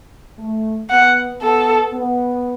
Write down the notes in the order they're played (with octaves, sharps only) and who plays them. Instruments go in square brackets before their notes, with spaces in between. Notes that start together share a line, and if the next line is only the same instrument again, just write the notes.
[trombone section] A3
[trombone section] B3 [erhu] F#5
[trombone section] B3 [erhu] A4
[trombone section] B3